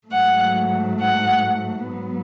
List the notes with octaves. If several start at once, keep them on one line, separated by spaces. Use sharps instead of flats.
G#2 F#3 A3 F#5
F#5
G#2 F#3 B3